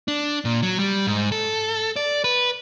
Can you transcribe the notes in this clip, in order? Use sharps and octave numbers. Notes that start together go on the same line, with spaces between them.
D4
A#2
F#3
G3
G#2
A4
D5
B4